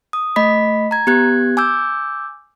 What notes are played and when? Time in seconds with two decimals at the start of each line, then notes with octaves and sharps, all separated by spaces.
0.13 D#6
0.36 A3 D#5 B5 B6
0.91 A#5 G#6
1.07 B3 G4 F#6 G#6
1.57 G#5 D6 E6 G6